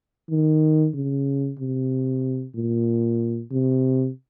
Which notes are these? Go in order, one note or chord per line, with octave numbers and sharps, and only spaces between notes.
D#3
C#3
C3
A#2
C3